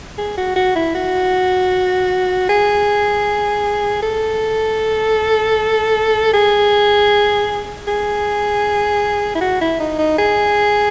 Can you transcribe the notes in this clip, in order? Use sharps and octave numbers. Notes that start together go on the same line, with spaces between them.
G#4
F#4
F#4
E4
F#4
G#4
A4
G#4
G#4
E4
F#4
E4
D#4
D#4
G#4